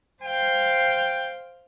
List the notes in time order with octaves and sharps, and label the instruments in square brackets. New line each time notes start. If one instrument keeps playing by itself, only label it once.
[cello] C5 F5 [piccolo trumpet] G5